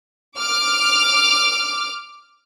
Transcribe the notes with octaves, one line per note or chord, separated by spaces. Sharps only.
D6 F6